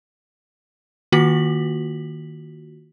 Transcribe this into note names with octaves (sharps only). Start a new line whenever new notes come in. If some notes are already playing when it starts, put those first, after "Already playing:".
D#3 A#3 F4 F#4 B6 F#7